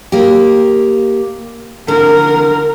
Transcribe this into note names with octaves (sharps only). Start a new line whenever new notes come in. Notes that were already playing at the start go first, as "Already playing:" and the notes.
A#3 G4
D3 A#4